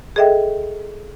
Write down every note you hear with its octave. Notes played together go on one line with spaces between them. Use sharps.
G#4 A4 D#5 E5 G5